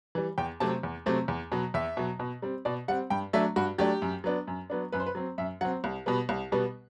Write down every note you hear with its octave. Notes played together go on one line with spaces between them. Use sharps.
E3 G3
E2 G5
C3 F#3 A3 C4 A5
E2
C3 F#3 A3 C4
E2
B2 F#3
E2 E5
B2 F#3
B2
G3 C4
B2 D5
G3 C4 F#5
G2 G5
F#3 A3 D4 E5
G2 F#4
F#3 A3 D4 G4
F#2
F#3 B3 D4
F#2
F#3 B3 D4
F#2 B4
C5
B4
F#3 C4
F#2 E5
F#3 C4 F#5
C2
B2 G3 B3
C2
B2 G3 B3